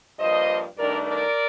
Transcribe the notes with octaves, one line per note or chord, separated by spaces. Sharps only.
G2 F3 A#3 C5 D#5
G2 D#3 A3 D4 A#4 D5
A#4 D5